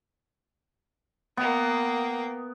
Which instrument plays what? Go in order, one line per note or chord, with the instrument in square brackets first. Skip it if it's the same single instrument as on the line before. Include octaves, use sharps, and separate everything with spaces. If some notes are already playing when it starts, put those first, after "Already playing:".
[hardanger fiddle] A#3 G5 [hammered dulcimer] B3